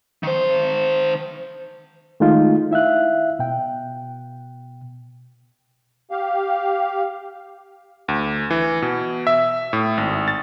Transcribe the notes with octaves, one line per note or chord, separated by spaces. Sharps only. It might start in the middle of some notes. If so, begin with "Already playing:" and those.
D#3 C5
D#3 G#3 A3 D#4 F4
E4 E5 F5 F#6
B2 G5
G4 F5
D2
E3
B2
E5
A2
G#1
A6